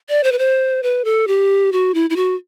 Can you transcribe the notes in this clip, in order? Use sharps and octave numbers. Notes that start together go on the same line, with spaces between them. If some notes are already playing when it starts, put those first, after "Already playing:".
D5
C5
B4
C5
B4
A4
G4
F#4
E4
E4
F#4